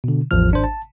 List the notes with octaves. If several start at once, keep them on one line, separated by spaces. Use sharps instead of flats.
B2 D3
A1 E2 F3 F6
G#1 D4 C5
A5